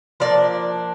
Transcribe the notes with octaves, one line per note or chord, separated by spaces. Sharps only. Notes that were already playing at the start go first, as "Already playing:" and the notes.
F3 A#3 D4 D5